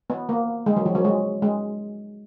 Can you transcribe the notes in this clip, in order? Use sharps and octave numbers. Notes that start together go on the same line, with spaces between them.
B3
A#3
G#3
F#3
F3
F#3
G#3
G#3